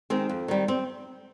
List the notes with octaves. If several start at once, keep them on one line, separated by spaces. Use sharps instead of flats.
D#3 G#3 C4
F2
D#3 G3
C4